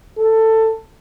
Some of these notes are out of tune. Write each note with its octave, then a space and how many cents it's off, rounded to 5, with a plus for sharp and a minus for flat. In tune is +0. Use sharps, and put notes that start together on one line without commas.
A4 +15